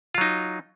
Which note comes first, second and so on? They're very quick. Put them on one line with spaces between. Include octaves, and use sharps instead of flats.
F4 F#3 D#4